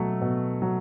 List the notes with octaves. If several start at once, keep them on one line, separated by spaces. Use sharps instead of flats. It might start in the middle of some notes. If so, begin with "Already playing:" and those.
Already playing: B2 F#3 A3
B2
F#3